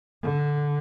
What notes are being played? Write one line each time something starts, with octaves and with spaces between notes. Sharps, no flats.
D3